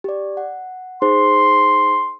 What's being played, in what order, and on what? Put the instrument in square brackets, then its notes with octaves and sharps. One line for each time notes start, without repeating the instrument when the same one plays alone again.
[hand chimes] G4 D5
F#5
[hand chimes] D#4 G#4 C5 [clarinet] C6